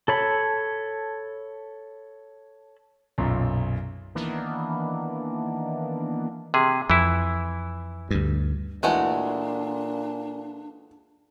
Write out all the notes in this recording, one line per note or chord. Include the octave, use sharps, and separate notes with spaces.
A4 C#5 B5
B1 F#2 A#2
D#3 E3 A#3 B3 D4
C3 G#4
F2 E3 E4
D2 G2
A#2 E3 G#3 A3 D4 F#4 G#5